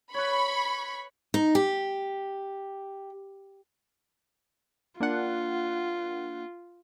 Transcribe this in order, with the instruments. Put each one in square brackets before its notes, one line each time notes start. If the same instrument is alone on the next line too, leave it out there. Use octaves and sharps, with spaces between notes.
[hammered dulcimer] B4 C#5 [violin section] B5 C#6
[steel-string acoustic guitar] D#4
G4
[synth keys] A#3 D4 F#5 [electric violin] F4